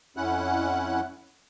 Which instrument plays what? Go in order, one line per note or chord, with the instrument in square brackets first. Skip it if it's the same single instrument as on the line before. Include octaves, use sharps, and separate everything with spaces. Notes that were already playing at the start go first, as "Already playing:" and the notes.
[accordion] F2 C#4 E4 F#5 F#6